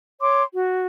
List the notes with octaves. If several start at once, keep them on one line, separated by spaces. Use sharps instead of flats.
C#5 C6 D6
F#4